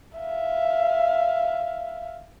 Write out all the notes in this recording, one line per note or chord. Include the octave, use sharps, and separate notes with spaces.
E5 F5